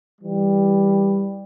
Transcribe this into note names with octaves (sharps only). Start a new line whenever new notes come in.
E3 G3